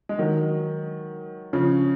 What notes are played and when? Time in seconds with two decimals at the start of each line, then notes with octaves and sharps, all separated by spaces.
0.09 G#3
0.19 D#3 F#3
1.53 C#3 F3